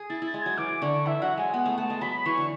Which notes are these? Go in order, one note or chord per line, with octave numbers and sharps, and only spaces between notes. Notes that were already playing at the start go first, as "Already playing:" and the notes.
Already playing: G#4
E4 A6
E4 A6
G#3
F#3 G#6
E3 D6
D3 C#6
E3 E5
F#3 F#5
G#3 G#5
B3 F#5
A3
A3 A5
G#3
F#3 B5
E3 C#6
D3